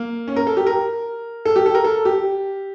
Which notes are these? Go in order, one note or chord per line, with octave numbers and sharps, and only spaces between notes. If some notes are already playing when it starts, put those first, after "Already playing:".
Already playing: A#3
C#4
A#4
A4
G4
A#4
A4
G4
A4
A#4
A4
G4